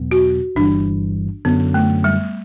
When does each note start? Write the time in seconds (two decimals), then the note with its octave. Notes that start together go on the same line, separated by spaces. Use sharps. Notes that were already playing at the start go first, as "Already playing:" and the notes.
Already playing: E2 B2 F#3 B3
0.11 F#4
0.56 G1 G2 E3 G3 D4
1.45 F#2 D3 F#3 B3
1.74 A3
2.04 G3